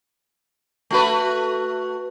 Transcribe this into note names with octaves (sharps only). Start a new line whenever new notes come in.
A3 F#4 B4